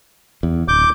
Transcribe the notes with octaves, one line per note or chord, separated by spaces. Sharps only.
E2
D1 D6 G6